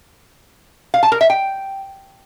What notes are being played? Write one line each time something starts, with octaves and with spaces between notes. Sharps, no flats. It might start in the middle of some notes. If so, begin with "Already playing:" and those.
F5
A5
A#4
E5
G5